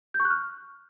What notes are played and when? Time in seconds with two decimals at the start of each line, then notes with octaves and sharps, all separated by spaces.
0.14 G6
0.20 C#6
0.25 F#6
0.30 F6